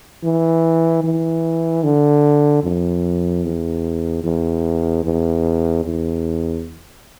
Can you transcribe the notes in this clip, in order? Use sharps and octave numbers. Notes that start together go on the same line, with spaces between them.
E3
E3
D3
F2
E2
E2
E2
E2